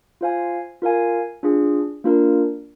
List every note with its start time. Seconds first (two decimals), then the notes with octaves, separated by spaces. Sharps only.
0.21 F4 C5 F5 G#5
0.82 F4 A#4 F5 G#5
1.43 D4 F4 G#4
2.04 A#3 D4 F4 A#4